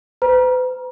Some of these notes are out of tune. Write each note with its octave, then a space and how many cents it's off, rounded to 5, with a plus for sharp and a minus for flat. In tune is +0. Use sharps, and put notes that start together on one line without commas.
B4 +40 A#5 +35